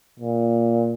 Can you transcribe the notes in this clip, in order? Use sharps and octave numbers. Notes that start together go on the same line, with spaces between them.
A#2